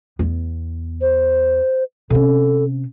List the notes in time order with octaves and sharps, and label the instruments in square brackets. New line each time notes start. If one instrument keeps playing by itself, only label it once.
[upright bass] E2 B3
[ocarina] C5
[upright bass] C3 C#4 [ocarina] A4